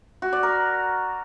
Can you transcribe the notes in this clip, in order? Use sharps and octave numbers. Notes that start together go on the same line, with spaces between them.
F#4
D5
A#4